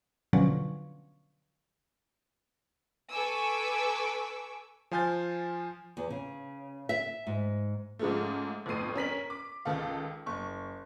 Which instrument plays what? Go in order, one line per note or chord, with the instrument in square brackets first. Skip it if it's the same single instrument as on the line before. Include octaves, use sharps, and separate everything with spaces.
[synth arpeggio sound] B2 D3 F3 F#3 C#4
[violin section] A4 B4 G#5 C#6 D6 E6
[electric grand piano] F3 C5 G#5 F6 G6 A6
[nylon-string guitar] E2
C#3
E5
G#2
[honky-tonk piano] G#2 C#3 F3 G#3 A3
G1 F2 A2 C7 D#7
C#4 A#4 B6 F#7
D6
C#2 D#3 A4 F5
F#1 C#6